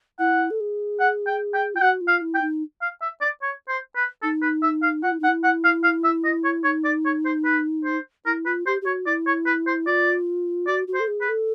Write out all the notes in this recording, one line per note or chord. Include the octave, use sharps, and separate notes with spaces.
E4 F#5
A4
G#4
F#5
G5
G5
F4 G5
F#4 F#5
F4
F5
E4
G5
D#4
F5
E5
D5
C#5
C5
B4
D#4 A4
B4
E5
F5
F4 F#5
E4
D#4
F#5
E4
F#5
F5
F5
E5
D#5
C#5
D#4 C#5
D5
C#5
C5
B4
C5
E4 A#4
F4 B4
G4 C5
G4
F#4 C#5
E4 D5
C#5
B4
C5
F4 D5
F#4 D5
F#4
C5
A4
G#4
B4
A4